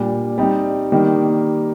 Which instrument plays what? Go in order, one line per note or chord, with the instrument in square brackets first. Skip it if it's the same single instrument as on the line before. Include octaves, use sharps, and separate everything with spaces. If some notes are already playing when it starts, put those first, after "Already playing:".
Already playing: [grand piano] A#2 G3 D4
G3 C4 D#4
D#3 G3 A#3 D#4